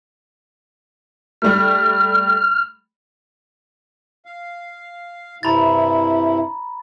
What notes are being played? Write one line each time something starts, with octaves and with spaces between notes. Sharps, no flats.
G3 A3 F6
F5
G2 C3 E4 A#5 B5 A6